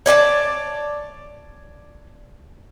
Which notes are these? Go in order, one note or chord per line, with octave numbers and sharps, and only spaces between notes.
C#5 D5 G#5 A5